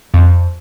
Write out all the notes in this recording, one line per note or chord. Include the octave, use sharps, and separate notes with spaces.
F2